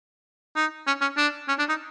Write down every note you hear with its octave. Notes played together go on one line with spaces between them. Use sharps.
D#4
C#4
C#4
D4
C#4
D4
D#4